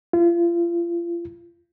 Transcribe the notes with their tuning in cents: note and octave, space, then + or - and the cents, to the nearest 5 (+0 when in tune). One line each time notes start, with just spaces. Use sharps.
F4 -35